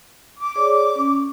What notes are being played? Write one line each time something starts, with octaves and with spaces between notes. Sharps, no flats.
D6
G#4 C#5 D5
C#4